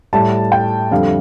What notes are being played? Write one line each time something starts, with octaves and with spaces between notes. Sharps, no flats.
A2 G3 A5
G5
F2 D3 G3 F5